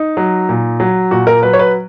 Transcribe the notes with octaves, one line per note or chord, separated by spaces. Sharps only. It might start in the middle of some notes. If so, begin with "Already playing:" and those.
Already playing: D#4
F#3
A#2
F#3
A#2 F#4
A#4
F#3 B4
C#5
B4